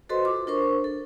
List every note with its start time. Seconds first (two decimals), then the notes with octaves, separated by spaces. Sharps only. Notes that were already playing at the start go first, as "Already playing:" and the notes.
0.09 F#4 A4 B4 C5 D#5 C6
0.25 F4 D6
0.47 D4 A#4 C5 C#6
0.84 A4